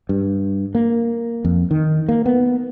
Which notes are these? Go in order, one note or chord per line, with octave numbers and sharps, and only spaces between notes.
G2
A#3
F2
D#3
A#3
B3